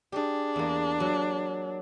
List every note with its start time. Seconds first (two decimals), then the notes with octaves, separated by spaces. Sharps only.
0.12 D4 G4 G#4
0.56 E2 A#3
1.00 F#3